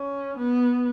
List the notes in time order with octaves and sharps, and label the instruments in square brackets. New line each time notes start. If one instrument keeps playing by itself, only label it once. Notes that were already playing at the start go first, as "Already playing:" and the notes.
Already playing: [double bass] C#4
B3